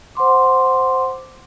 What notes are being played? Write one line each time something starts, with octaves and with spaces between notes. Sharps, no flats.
C5 F#5 C6 D6